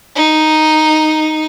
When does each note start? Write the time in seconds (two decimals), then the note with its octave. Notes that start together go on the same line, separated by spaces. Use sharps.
0.15 D#4